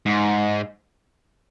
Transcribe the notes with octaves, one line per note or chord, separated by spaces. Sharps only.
G#2